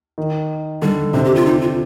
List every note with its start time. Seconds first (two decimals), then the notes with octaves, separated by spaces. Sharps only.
0.18 D#3
0.82 D3 G3
1.14 C3 D4
1.25 G4
1.35 F4
1.46 D#4
1.62 F4